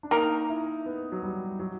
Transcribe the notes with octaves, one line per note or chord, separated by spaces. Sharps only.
D4
A#3 D#4 A#4
E4
B3
F#3
G3
F#3